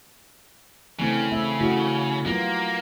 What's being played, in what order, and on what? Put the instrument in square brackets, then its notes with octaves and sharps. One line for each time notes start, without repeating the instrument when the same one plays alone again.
[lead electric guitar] C#3 [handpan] E3 A3 C4
[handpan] A3 C4 E5
A3 E4 F#4
[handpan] F#3 B3 F4 [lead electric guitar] A#3